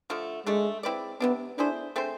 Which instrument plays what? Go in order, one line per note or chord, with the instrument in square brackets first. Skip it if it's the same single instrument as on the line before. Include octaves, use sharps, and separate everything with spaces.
[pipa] D3 F3 A3
[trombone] G#3 [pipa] A3 D4 A4
[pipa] C4 E4 B4 D5
[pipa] C3 G#3 D4 [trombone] B3
[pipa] A3 E4 G#4 C5 [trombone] D4
[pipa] A3 C4 G#4 C5